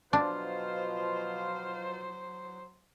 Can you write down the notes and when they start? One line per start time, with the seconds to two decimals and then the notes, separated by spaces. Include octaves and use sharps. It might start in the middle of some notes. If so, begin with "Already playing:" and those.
0.13 B2 F3 F#3 D4 F4 C5